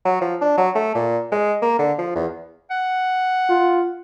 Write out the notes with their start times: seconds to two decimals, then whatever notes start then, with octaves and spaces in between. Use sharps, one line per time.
0.05 F#3
0.21 F3
0.41 D4
0.58 F#3
0.75 A3
0.95 A#2
1.32 G#3
1.62 A#3
1.79 D3
1.98 F3
2.15 E2
2.71 F#5
3.49 F4